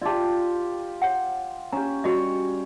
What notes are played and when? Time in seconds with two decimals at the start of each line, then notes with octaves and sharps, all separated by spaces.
0.02 F4 G4 D5 A5
1.02 C#5 F#5
1.73 C#4 G4 A#5
2.04 G3 F#4 C#5 D#5